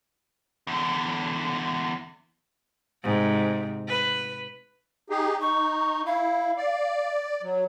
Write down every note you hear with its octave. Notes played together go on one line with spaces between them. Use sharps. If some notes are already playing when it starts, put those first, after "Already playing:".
E2 D3
G#2 C3
B4
D#4 G4 G#4
D#4 C#6
E4 F5
D5
F#3